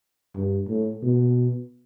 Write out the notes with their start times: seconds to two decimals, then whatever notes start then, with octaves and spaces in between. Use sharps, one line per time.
0.36 G2
0.69 A2
1.03 B2